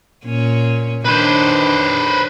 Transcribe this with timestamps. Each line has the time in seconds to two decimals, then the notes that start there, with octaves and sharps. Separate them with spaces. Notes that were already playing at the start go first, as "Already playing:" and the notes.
0.25 A#2 C#4
1.05 D#3 D4 B4 C5